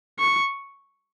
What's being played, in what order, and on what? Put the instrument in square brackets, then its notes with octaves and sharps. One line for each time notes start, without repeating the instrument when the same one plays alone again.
[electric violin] C#6